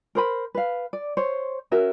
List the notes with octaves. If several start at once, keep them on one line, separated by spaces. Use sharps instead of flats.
A#4 C5 B5
B4 F5
D5
C5 C#5
C#4 F#4 A#4 E5